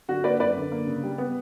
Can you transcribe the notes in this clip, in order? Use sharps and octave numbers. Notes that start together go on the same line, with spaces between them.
D3 F#4
A#3 B4 D5
F#2 B4 D5
D3
A#3
C#3
G3
B3